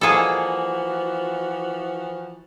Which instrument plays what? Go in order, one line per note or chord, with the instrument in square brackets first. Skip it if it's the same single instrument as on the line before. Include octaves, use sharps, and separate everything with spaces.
[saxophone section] E3 F3 F#4 [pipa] G3 G#3 A#3 [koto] G#4 A4